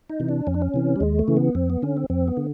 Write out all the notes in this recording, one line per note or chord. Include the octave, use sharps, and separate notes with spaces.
D#4
C3 E3
D4
F2 C#4
D4
C#4
C3 E3
G3
D#2 G#3
A3
C#3 E3
B3
F2 C4
B3
D3 C#4
C4
F2 C4
B3
D3